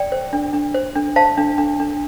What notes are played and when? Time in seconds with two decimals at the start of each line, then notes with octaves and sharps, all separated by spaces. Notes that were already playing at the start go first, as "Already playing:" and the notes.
Already playing: D5 G5
0.12 C5
0.33 D4
0.53 D4
0.74 C5
0.96 D4
1.16 C5 F5 A5
1.38 D4
1.58 D4
1.80 D4